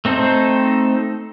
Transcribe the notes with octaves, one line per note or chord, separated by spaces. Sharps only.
A3 C4 D#4 A4 C5